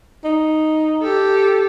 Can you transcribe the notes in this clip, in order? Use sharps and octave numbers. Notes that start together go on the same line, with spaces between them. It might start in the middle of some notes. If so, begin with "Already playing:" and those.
D#4
G4 A4